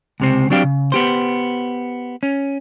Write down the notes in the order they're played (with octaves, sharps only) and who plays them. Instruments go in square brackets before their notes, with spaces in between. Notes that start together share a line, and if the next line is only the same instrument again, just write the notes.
[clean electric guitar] C#2 C3 C4
F#3 C4 D4 G4 F5
C#3
B3 G4 C5
C#4